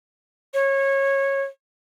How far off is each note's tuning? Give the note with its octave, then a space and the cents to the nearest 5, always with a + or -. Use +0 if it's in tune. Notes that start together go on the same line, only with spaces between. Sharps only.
C#5 -20